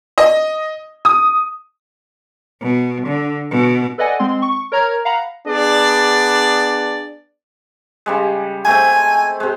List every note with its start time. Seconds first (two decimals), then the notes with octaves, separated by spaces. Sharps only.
0.18 D#5
1.05 D#6
2.62 B2
3.07 D3
3.51 B2
3.98 A4 B4 D5 D#5 F#5 G#5
4.19 G#3 C4 C6
4.42 C#6
4.72 A#4 C#5 A#5 F6 G#6
5.05 F5 F#5 A#5 B5
5.48 B3 D4 G#4 D5
8.06 C#3 G3 G#3
8.65 G#3 A3 C4 G#5
9.40 C3 G#3